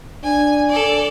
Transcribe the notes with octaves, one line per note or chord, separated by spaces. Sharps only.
D4 G#5
A4 D5